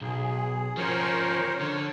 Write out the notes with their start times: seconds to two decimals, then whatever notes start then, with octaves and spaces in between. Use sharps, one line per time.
0.01 B1 G#4
0.77 F3 C#4 A#4 C5 C#5
1.61 D3 C#5